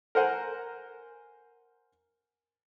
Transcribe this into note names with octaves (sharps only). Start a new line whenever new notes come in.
A#4 C5 F#5 G#5